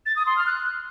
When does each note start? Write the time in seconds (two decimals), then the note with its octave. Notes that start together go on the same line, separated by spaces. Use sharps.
0.06 A6
0.16 D#6
0.26 C6
0.36 F6
0.47 F#6